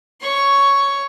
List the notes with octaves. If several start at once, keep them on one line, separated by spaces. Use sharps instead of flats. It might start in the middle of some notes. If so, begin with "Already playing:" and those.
C#5 C#6